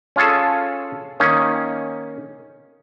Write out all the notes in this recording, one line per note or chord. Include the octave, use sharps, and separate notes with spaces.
C#4 F4 G#4 A4
D#3 A#3 C#4 D#4